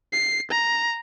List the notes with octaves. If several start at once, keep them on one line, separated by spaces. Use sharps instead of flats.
C7
A#5